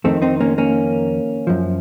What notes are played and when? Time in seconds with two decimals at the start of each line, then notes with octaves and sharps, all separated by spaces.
0.04 F2 D#3 A3 C4
0.22 C4 D#4
0.41 A#3 C#4
0.58 A#3 C#4
1.47 F#2 F3